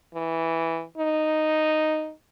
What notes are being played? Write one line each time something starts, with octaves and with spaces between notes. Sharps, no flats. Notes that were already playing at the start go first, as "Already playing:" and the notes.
E3
D#4